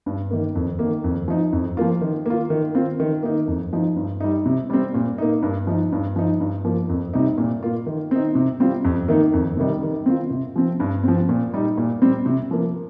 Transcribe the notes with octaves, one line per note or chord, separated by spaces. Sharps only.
G2
D#3 A#3
F2
D#3 A#3
F2
F3 D#4
F2
F3 A#3 F4
D#3
A#3 F4
D#3
C4 F4
D#3
A#3 D#4
F2
F3 D#4
G2
G3 D#4
C3
G3 C4
A#2
A#3 D#4
G2
F3 D#4
G2
F3 D#4
G2
F3 A#3
F2
C3 G3 D#4
A#2
A#3 F4
D#3
C4 D#4
C3
G3 C4 F4
F2
D#3 A#3 D#4
F2
C3 D#3 G3 D#4
D#3
C4 F4
C3
F3 C4
G2
F3 C4
A#2
G3 D#4
A#2
G3 C4
C3
F3 A#3